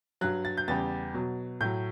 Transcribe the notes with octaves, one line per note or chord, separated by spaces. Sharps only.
G2 F#3 F#6
A6
G6
E2 C#3 G3 A6
B2 F#3
A2 F#3 G6